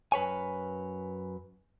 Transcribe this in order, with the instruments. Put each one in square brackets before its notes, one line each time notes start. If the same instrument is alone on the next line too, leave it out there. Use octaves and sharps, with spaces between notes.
[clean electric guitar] F#2 B4 C#5 G#5